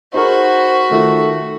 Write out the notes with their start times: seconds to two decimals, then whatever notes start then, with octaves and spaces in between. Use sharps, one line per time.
0.14 D#4 F#4 G#4 A#4 C5 B5
0.91 D#3 A3 F4